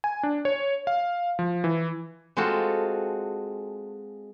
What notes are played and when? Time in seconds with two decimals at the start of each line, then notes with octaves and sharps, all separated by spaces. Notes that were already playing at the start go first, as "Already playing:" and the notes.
0.04 G#5
0.23 D4
0.45 C#5
0.87 F5
1.39 F3
1.64 E3
2.37 G#3 C4 F4 F#4 A4